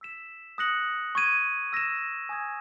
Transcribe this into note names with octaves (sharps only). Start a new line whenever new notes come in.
E6 B6 E7
D#6 F#6 A#6 C#7 F#7
C#6 G#6 D#7
E6 A#6 E7
G#5 D#6 G#6